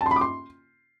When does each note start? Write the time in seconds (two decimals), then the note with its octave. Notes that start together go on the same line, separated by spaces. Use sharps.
0.01 A5
0.06 C6
0.11 B5
0.16 D6
0.21 C6